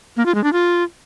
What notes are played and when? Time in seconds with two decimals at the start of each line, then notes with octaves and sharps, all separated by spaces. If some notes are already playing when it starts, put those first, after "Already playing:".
0.17 A#3
0.26 F4
0.35 G#3
0.44 D4
0.53 F4